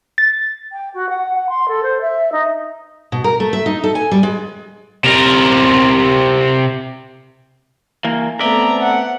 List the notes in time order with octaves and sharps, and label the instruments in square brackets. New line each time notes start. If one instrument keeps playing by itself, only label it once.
[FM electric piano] A6
[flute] G5
F#4
F#5
F#5
C6
A4
C5
E5
D#4
[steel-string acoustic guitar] B2
A#4
A3
E5
D#4
A4
G#5
G3
G#3
[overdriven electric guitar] C3 A#4
[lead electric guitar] E3 A#3
[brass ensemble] A3 B3 C4 [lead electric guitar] D5 E5 [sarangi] A#5
[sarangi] F#5